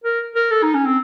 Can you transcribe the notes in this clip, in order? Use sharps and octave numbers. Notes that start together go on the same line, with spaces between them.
A#4
A#4
A4
D#4
C#4
C4